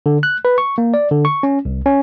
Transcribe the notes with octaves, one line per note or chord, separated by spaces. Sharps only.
D3
F#6
B4
C#6
A#3
D5
D3
C#6
C#4
C2
C#4